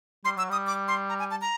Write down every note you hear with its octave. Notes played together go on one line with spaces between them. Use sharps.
G3 C6
F#3 E6
G3 D#6
D6
C6
A#5
G#5
A5
A#5